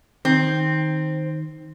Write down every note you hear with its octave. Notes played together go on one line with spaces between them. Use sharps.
D#3 C4